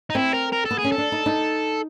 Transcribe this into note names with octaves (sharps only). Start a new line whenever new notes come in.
D#4
C4 E4
A#4
A#4
A4
B3
G#4
C#4
A4
D4
D#4
D#4